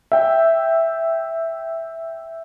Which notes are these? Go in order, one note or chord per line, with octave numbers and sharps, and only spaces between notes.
E5 G5